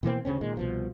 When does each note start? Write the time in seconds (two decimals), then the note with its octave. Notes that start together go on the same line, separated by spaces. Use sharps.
0.03 B2 E3 A#3 C4
0.25 D2 C#3 C4 C#4
0.41 A#2 D#3 G#3
0.57 C2 B2 F3